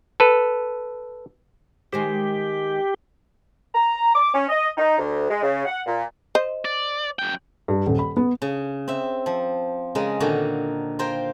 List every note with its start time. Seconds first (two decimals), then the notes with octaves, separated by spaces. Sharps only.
0.20 A4 B4
1.93 D#3 G#3 G4 C5
3.74 A#5
4.14 D6
4.33 C#4
4.49 D#5
4.77 D#4
4.98 D2
5.29 G#3
5.42 C#3
5.65 F#5
5.86 A#2
6.35 C5 D#5
6.65 D5
7.19 F#2 G5
7.68 G2
7.86 D#1
7.99 B5
8.17 B3
8.42 C#3
8.88 C4 E5
9.26 F3
9.95 C#3 G#3 A#4
10.20 A#2 D3 D#3 F#4
10.99 F4 A#4 C5 G5